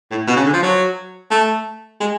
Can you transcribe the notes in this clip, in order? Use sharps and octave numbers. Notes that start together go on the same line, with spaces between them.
A2
B2
C#3
D3
F3
F#3
A3
G#3